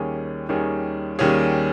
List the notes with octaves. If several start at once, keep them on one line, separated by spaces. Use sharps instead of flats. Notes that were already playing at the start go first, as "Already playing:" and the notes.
Already playing: D#2 D#3 G3 C#4 G#4
D#2 D#3 G3 C#4 G#4
D#2 D#3 G3 C#4 G#4